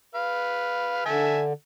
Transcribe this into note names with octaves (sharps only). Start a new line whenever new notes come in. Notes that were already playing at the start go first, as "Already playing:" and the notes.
B4 F5
D3 E5 G#5 A5